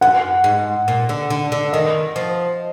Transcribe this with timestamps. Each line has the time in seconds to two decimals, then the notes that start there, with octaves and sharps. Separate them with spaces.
0.01 F#2 F#5
0.44 G#2
0.88 A#2
1.09 D3
1.30 D3
1.52 D3
1.73 D#3 D#5
2.16 F3